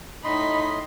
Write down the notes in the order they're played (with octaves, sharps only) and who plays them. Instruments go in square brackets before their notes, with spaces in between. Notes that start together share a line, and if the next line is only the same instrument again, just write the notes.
[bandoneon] A2 D#5 C6 [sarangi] D#4 [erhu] B5